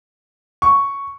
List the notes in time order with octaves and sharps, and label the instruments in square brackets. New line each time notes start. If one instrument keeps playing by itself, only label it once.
[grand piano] C#6